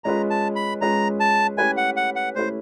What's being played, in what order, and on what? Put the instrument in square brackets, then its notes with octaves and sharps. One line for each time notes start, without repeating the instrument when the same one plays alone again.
[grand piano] G#3 C#4 F4 G#4 B4 [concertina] A#5
[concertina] A5
B5
[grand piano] G#3 C#4 F4 G#4 B4 [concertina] A#5
[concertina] A5
[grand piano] A3 C#4 E4 G4 B4 [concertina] G#5
[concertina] F#5
F#5
F#5
[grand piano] A3 C#4 E4 G4 B4 [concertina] C5